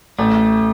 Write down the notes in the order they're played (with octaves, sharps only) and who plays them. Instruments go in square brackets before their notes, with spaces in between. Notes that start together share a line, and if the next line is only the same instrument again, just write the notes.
[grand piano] A1 [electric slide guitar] A3